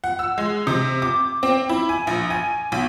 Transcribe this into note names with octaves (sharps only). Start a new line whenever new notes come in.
F#5
E6
G#3
C3
D6
C4
E4
G#5
A#1
G#5
B1